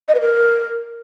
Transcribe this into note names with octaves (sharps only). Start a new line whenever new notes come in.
D#5
B4
A#4